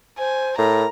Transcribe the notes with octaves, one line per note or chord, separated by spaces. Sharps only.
C5 G#5
A2 A#4 A#5